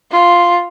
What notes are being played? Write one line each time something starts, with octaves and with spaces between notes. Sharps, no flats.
F4